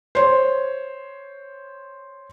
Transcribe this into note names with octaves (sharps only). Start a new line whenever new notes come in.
C5 C#5